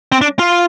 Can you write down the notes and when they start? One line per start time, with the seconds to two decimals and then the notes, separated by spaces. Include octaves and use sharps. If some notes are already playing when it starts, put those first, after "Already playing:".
0.12 C4
0.21 D4
0.39 F4